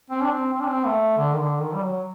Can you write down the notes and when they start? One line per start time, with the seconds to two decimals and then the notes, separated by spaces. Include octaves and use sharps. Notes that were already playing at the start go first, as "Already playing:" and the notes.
0.10 C4
0.23 D4
0.32 C4
0.53 C4
0.60 D4
0.67 C4
0.85 A3
1.17 D3
1.33 D#3
1.39 D3
1.60 D#3
1.74 G3
1.82 F#3